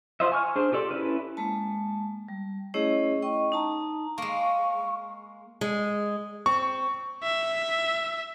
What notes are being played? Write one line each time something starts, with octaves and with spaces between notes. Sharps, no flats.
F4 F#4 C5 D#5 E5
G#5 C#6 F6
D4 G#4 C5
F4 G4 A4 D5
C#4 E4 A4 B4
G#3 A#3 A5
G3
A3 C#4 E4 G#4 C#5 D#5
D#5 G5 C#6
D#4 A5 A#5
G#3 A#3 C#6
G#3
C4 C#6
E5